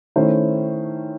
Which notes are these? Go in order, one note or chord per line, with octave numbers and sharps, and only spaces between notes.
D#3 A3 C#4 E4 C5